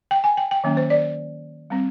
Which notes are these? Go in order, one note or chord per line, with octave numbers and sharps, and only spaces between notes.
G5
G#5
G5
G5
D#3 F#3 A#3 C#4
C5
D5
G3 C4